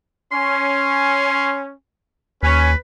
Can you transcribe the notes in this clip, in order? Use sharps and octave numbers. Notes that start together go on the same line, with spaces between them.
C#4 C6
D#2 C#4 B4